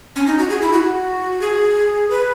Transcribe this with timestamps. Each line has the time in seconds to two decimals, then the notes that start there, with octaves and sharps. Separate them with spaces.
0.16 C#4
0.27 D#4
0.38 F#4
0.50 G#4
0.62 E4
0.73 F#4
1.41 G#4
2.11 B4